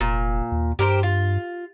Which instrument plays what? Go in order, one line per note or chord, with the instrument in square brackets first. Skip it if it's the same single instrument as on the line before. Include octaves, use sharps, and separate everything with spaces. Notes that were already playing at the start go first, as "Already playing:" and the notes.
[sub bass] F1 [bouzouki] A#2
[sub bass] D#2
[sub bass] G2 [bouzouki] G4 A#4 C5
[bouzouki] F4